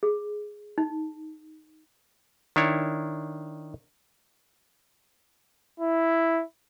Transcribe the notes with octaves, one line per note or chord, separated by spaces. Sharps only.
G#4
D#4
D#3 D4 E4 C#5
E4